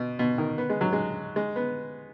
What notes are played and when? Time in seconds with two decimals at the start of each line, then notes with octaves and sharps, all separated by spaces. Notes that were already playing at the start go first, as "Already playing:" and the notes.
Already playing: B2
0.19 B2
0.38 D#3
0.58 B3
0.70 G#3
0.81 F#3
0.93 G#3
1.36 G#3
1.56 B3